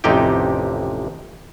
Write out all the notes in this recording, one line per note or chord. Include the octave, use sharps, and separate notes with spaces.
A1 F2 C3 D#4 G4 G5